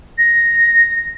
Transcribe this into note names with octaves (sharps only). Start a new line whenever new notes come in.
A#6